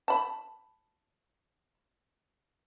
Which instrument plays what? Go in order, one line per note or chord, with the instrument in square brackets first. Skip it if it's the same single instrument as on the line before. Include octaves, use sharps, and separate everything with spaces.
[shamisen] A5 B5